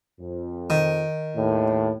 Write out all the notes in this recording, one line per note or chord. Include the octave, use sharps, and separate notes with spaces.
F2
D#3
D#2 A2